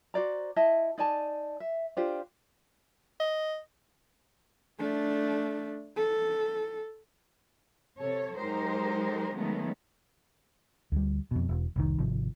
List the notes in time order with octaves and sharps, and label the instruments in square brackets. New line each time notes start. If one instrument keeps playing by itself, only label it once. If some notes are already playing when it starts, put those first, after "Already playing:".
[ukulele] F#4 C5 D5 A#5
E4 D#5 E5 A5
D#4 D5 G#5 A5
E5
D4 F4 G4 C5
[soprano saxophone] D#5
[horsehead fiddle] A3 D4
A4
[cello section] C3 A4 C#5
F#3 G#3 D#4 G4 A#4 C5
D#3 F#3 G#3 A3 B3 C#4
[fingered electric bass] D2 G3
F2 B2
E1
F1 C2 D#3
G#1 C3 F3